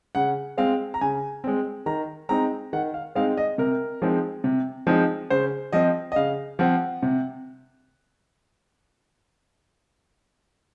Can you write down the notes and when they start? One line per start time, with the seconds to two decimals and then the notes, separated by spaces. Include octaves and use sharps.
0.15 C#3 F#5
0.57 G#3 C4 F5
0.94 A#5
1.01 C#3 G#5
1.44 G#3 C4
1.86 D#3 A#5
2.29 G#3 C4 D#4 A#5
2.73 D#3 F#5
2.94 F5
3.15 G#3 C4 D#4 F5
3.37 D#5
3.58 C3 A#4
4.02 F3 G#3 C4 D#4
4.44 C3
4.87 F3 G#3 C4 D#4
5.30 C#3 C5
5.73 F3 C4 D#5
6.12 D#5
6.16 C#3 F5
6.59 F3 C4 F#5
7.03 C3